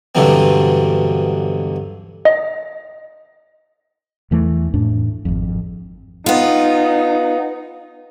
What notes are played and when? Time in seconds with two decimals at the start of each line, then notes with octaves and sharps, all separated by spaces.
0.15 G2 B2 D3 E3 F#3 C4
2.25 D#5
4.31 E2 E3 A3
4.74 F2 A2 D4
5.25 G#1 F2
6.26 B3 D#4 F4